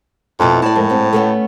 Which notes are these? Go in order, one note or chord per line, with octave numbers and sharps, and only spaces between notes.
F2 B2 E4 D5
A2 D5 A5
F2 G#2 A#4
G#2 C4
A3 B3 C#4